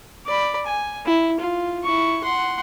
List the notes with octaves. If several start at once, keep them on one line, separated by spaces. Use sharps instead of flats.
D5 B5
G#5
E4
F4
E4 C#6
F#5 C6